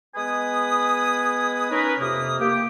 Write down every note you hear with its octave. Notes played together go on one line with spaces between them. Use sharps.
G#3 B3 B4 G#5 D#6
C#4 D#4 A#4 B4
F2 C3 A#3 D#6
A#3 G4